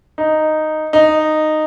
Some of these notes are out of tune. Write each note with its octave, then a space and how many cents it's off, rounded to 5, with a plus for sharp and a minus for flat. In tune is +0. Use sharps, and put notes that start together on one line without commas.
D#4 -5
D#4 -10